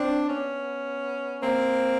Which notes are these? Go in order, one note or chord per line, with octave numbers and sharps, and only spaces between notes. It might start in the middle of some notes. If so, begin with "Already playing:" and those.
Already playing: C4 D4
B3 C#4
A#3 C4